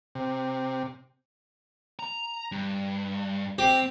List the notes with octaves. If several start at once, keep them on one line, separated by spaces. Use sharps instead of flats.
C3
A#5
G2
C4 G4